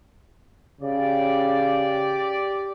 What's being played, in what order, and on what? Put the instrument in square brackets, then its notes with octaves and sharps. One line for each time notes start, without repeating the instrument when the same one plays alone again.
[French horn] C#3 [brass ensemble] G4 D5